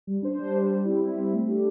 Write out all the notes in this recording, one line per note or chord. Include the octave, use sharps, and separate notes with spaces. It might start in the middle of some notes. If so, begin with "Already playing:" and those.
G3
D4 C5
G3
D4 C5
G3
C4 E4
G3
C4 E4
A3
D4 G4